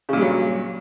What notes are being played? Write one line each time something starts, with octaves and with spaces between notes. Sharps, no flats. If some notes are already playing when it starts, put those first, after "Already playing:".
G2 A#2 C#3 F#3